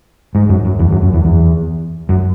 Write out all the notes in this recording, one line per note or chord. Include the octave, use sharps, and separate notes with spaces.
G#2
F#2
F#2
E2
F#2
F#2
E2
E2
F#2